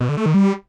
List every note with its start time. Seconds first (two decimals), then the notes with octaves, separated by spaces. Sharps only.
0.01 B2
0.09 D3
0.17 A3
0.26 D#3
0.34 G3